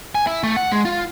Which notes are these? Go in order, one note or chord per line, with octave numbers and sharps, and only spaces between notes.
G#5
E4
A3
F#5
G#3
F4